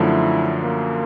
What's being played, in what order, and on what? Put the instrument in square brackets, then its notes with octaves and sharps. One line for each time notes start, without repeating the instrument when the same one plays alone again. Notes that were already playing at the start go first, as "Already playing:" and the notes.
Already playing: [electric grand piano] F#2 D3 F3 A3 [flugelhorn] E4
[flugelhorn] A#3